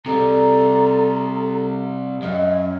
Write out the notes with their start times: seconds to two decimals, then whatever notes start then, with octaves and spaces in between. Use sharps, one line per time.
0.06 C3 G3 G#4 A4 D5 A#5
2.22 F#2 C#4 D#5 F5 G5